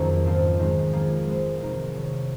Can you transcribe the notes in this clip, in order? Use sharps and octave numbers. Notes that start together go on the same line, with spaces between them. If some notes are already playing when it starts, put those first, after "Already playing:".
Already playing: F2 D#3 F#3 A#3 C#4 G#4 C5
G#2 F3 C4 F4
D#3 G#3 C4
F3 A#3 F4 G#4
G#3 C4 D#4 A#4
C3 D#3 G#3 D#4 A#4
F3 C4 F#4 C#5